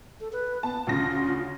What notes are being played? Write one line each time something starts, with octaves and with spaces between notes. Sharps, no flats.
A4
B4
B3 A5
D2 C#3 F4 A#6